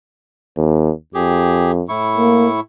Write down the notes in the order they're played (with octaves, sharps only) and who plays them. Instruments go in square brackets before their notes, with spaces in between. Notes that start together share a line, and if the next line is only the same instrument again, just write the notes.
[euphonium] D#2
[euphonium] F2 [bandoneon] G4 G#4
[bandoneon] A2 E4 C#6
[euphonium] A#3